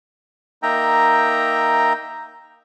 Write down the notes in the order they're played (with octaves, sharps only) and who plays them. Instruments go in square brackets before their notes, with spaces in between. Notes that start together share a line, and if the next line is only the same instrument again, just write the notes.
[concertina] A#3 D#4 E5 G5 A#5